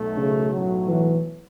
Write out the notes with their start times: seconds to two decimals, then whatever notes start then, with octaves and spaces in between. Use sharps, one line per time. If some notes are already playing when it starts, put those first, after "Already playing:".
Already playing: B1 B2 A3
0.17 C#3
0.52 B1 A2 F#3
0.88 E3